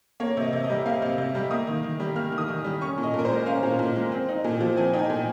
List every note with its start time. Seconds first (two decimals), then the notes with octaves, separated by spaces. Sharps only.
0.20 A#3 C#5
0.37 C3
0.42 D#5
0.53 C3
0.64 D#5
0.70 G3
0.86 A#3 F5
1.02 C3
1.18 C3
1.35 G3
1.51 A#3 D#6
1.67 D#3
1.83 D#3
2.00 G3
2.16 A#3 F6
2.32 D#3
2.38 D#6
2.48 D#3
2.64 G3
2.81 C#4 C#6
2.98 A#2
3.03 D#5
3.14 A#2
3.19 A#4
3.25 C5
3.30 G#3
3.46 C#4 F5
3.63 A#2
3.79 A#2
3.96 G#3
4.12 C4
4.29 D#4
4.44 A#2
4.61 F3
4.77 C4 G#5
4.93 D#4 G5
4.99 G#5
5.10 A#2